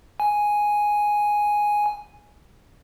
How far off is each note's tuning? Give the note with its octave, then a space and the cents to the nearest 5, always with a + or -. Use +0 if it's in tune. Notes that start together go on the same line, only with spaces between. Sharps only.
G#5 +0